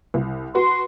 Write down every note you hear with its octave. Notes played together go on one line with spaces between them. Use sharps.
C2
F#4 B4 C6